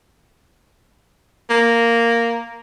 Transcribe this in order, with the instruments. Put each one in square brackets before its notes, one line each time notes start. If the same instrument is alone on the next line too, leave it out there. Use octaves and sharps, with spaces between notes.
[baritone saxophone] A#3